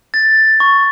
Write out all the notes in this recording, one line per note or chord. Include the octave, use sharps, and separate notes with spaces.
A6
C#6